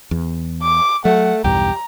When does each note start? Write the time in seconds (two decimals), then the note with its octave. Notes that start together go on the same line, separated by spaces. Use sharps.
0.11 E2
0.62 D6
1.05 F#3 A3 F#5
1.44 B1 E2 G2 G4 A#5